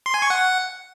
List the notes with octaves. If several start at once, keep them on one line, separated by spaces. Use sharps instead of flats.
C6
G#5
C#6
F#5